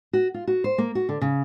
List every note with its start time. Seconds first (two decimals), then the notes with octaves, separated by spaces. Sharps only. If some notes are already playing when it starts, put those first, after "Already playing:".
0.13 F#4
0.34 F4
0.47 F#4
0.64 C5
0.78 A#3
0.95 F#4
1.09 D3
1.21 C#3